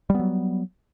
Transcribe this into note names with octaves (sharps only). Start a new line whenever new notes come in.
F#3 G3 B3